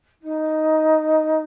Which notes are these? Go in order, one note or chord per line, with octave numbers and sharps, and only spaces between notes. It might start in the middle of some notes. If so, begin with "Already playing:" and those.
D#4